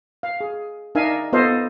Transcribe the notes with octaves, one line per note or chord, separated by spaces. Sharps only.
F5
G#4
D4 D#4 A#4 E5 F5 G#5
B3 F4 A4 C5 D#5 F5